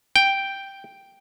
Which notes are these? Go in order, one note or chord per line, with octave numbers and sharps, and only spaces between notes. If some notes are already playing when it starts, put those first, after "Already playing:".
G5